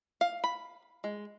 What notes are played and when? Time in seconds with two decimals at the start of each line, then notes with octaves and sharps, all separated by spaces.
0.21 F5
0.44 B5
1.04 G#3